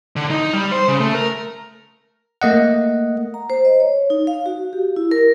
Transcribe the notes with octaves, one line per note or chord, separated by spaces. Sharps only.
D3
D#4
G3
C5
C#3
A3
A#4
A3 A#3 D#5 F#5
A#5
C5
D#5
C#5
D#4
F5
F#4
G4
E4
A#4